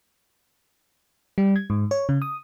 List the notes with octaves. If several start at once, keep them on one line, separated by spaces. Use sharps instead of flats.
G3
G#6
G#2
C#5
C#3
D#6